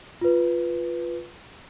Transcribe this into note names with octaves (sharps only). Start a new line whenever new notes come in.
F4 B4